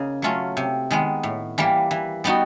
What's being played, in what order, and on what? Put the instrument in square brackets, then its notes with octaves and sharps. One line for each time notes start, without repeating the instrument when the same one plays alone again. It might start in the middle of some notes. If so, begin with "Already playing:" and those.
Already playing: [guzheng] C#3 A#3 D#4
F#3 A3 C#4 F4
C3
D#3 G#3 B3
A2
E3 G3 A#3
E3
G3 B3 D#4 F#4